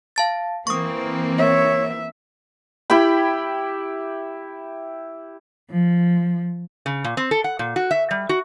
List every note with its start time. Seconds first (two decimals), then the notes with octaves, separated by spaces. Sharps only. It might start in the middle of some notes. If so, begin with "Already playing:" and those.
0.16 F5 A5 A6
0.67 E3 A#3 C4 C#6 D#6
1.38 C#5 E5
2.90 E4 G4 G5 B5
5.70 F3
6.86 C#3
7.04 A#2
7.17 C4
7.31 A4
7.44 F#5
7.59 A#2
7.76 F#4
7.91 E5
8.11 G3
8.29 F#4